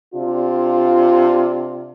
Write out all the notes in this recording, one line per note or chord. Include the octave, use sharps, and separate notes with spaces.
C3 D4 F4